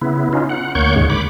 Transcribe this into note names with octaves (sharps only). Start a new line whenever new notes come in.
C#3 B3 E4
C#4 D#4 F4
F#5
D2 A#3 C#5 F#5 C#6 G6
D#2 G#2 C#3 G#3 C#5
B5 D6